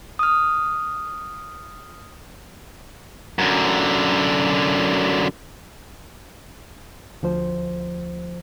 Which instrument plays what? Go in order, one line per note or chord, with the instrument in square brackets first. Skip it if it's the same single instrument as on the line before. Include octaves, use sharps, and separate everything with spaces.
[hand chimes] D#6 F6
[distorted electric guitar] F#2 D3
[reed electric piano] D2 F3 C5